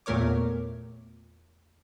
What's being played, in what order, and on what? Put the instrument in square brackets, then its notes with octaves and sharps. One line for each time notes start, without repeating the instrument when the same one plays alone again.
[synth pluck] E2 A#2 A3 A#4 C#5 D6